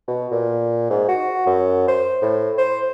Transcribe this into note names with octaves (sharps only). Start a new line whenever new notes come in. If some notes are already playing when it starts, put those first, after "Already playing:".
B2
A#2
G#2
F#4
F#2
C5
A2
C5